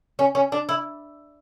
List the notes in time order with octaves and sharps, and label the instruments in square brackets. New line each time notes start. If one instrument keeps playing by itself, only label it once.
[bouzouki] C#4
C#4
D4
E4